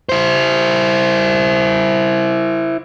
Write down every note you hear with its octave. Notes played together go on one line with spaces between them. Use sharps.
E4 C5